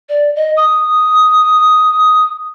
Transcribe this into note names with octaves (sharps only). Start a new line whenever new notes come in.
D5
D#5
D#6